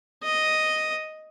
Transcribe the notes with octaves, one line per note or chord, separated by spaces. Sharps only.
D#5